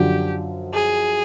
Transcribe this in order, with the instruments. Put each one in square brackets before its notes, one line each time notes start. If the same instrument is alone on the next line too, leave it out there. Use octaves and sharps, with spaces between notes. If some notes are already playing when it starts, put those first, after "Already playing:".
Already playing: [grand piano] F#2 D3 F3 [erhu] G4
[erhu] G#4